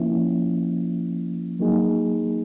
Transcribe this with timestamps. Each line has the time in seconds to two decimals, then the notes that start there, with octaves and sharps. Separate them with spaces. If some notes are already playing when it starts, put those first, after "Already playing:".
Already playing: F3 A#3 C#4 E4
1.59 F#3 A#3 D#4 G#4